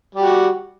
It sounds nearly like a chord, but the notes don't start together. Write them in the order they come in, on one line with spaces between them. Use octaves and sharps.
G3 G4 F#4